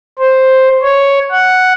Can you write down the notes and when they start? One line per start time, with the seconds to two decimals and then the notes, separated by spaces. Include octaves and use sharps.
0.19 C5
0.83 C#5
1.31 F#5